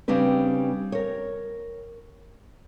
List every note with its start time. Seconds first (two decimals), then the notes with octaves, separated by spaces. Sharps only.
0.08 C#3 G3 C4 D4 B4
0.92 A#4 C#5